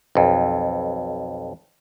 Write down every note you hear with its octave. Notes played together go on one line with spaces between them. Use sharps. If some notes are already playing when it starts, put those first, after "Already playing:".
B1 F2